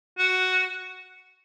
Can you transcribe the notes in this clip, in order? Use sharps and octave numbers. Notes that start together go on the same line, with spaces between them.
F#4